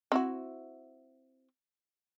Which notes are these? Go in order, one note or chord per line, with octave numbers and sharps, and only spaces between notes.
C4 E4 F#4